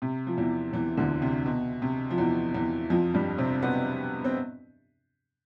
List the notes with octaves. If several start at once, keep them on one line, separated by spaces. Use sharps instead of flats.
C3
F3
E2 E3
E2 E3
D2 D3
C3
B2
C3
F3
E2 E3
E2 E3
F2 F3
G2 G3
C3 C4
B2 B3
C4